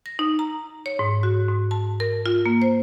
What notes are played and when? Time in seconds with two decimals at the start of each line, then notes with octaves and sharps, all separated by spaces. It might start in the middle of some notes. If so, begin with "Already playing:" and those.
0.06 A#6
0.19 D#4
0.39 A#5
0.86 C#5
0.99 G#2
1.23 F#4
1.49 G#2
1.71 A5
2.00 A#4
2.26 F4
2.46 A#3
2.62 C5